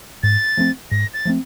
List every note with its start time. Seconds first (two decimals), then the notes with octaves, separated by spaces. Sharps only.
0.23 G#2 A6
0.57 F3 A3 C4
0.91 G#2 A#6
1.14 A6
1.25 F3 A3 C4